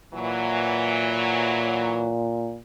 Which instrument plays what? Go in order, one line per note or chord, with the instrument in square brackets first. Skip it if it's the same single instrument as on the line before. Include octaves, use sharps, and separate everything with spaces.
[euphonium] A#2 [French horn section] E3 F#3